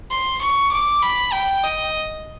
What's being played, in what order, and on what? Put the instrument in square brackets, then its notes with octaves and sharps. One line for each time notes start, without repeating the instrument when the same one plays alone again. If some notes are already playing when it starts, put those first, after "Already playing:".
[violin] C6
C#6
D6
B5
G5
D#5